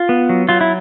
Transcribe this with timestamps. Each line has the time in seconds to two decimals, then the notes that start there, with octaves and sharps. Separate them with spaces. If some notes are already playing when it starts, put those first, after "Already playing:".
Already playing: F4
0.09 B3
0.29 F#3
0.49 F#3 F4
0.61 E4